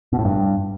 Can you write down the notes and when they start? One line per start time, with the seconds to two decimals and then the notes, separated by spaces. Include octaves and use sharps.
0.13 B2
0.19 A2
0.25 G2